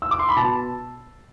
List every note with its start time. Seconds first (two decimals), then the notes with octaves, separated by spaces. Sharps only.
0.02 E6
0.11 D6
0.19 C6
0.29 B5
0.36 B2 A5